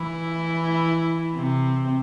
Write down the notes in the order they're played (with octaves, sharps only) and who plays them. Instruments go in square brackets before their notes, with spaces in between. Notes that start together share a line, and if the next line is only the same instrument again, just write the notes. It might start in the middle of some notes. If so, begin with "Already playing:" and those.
Already playing: [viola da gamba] E3 E4
C3 C4